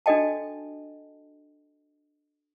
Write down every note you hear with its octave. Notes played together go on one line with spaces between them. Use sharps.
D4 F#4 A4 D#5 G5 A5